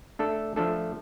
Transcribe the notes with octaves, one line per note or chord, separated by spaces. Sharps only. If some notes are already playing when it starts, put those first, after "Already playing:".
A3 D4 A4 D5
F3 A3 D4 A4